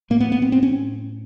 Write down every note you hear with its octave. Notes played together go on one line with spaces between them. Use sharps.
A2 A#3
B3
B3
C4
C4
C#4